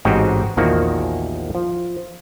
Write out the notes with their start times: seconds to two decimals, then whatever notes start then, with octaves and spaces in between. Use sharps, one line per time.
0.05 A1 G#2 C4 F#4 G4 D#5
0.57 A#1 E2 D#3 F3 A#3 F#4
1.55 F3